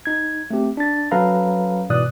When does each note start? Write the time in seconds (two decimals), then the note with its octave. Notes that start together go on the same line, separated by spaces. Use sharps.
0.06 D#4 G#6
0.50 A3 C4 G4
0.77 D4 A6
1.11 F#3 C#4 A4 B4 F5 A#5
1.90 G#2 B2 E3 D5 D#6 F#6